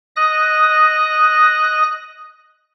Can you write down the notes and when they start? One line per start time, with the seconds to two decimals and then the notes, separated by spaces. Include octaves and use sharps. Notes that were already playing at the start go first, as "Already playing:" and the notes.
0.16 D#5 D#6 F#6 A#6